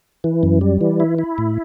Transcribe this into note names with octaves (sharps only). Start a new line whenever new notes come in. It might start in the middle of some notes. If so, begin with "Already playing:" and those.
E3
F#2
G3
E3
E4
E4
A2